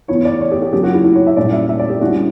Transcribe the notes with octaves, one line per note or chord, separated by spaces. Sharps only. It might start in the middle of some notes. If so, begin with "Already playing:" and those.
E3 B3 E4 C#5
D5
C#5
G4
G4
C#3 F#3 A#3 C#4 G4
F#4
E4
E4
C#5
E5
A#2 G3 C#4 E4 D5
E5
E5
D5
G4
D3 G3 C#4 E4 F#4